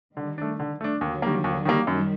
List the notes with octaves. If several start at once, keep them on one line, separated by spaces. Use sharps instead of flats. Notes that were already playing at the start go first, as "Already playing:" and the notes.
D3 D#3 G3
A3 D4
D3
A3 D4
D#2 D3 F#3
D#3 G3 A#3
D#2
D#3 G3 A#3
F#2 D#3 G3